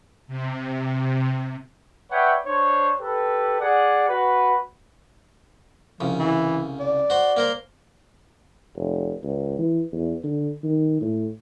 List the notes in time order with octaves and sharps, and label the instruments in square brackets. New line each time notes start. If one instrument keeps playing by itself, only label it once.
[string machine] C3
[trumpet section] B4 C#5 D5 E5 F#5 G5
D4 C5 C#5
G4 A4 B4
G#4 D5 F#5
F#4 B4
[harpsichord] C2 C#3 [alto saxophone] F3
[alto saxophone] E3
D5
[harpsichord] F#4 C5
A#3 A#4 C5
[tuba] F1
C#2
E3
E2
D3
D#3
A2